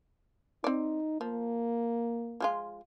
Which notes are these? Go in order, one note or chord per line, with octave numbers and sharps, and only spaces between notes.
C4 D#4 D5
F3 A#3
F3 G#3 F4